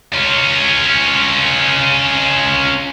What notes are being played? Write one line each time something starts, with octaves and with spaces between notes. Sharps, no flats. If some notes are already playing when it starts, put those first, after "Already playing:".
C#4 F4